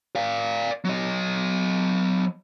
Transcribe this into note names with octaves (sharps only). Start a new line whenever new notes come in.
D5 F5
F#3 D#5